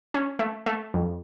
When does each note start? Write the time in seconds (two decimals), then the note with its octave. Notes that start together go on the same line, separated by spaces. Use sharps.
0.14 C#4
0.39 A3
0.66 A3
0.94 F2